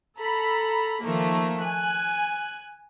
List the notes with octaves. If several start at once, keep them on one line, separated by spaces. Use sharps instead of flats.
A4 A#5 B5
D#3 F3 A3 A#3 A#4
G#5 F#6